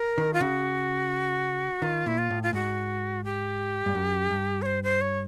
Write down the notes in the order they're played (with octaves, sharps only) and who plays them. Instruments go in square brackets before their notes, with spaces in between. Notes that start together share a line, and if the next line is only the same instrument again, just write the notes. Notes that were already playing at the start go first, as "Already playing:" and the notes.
Already playing: [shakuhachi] A#4
[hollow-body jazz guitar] D#3
[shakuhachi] F4
[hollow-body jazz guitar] C#3 [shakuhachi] F#4
[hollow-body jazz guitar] D#3 [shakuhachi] F4
[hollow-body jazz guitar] A#2 [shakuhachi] E4
[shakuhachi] F4
[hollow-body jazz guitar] A2
[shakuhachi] F4
[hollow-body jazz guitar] G#2 [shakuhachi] F#4
[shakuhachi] G4
[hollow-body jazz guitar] G2
F#2
G2
[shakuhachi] C#5
C5
C5
C#5